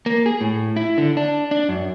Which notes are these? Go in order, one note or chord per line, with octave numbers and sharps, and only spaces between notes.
A#3
G#4
A2
E4
D3
D4
D4
F#2